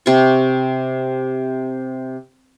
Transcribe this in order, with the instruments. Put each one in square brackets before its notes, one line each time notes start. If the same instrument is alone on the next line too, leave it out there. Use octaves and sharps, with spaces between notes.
[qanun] C3 C#6